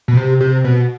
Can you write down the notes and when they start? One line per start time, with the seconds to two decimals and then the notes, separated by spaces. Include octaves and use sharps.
0.08 B2
0.17 C3
0.41 C3
0.64 B2